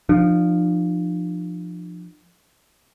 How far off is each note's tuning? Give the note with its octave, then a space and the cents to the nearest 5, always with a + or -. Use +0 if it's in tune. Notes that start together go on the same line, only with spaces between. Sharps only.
F3 +0 D4 +45